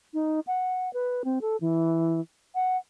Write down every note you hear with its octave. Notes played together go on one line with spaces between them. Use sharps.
D#4
F#5
B4
C4
A4
E3
F#5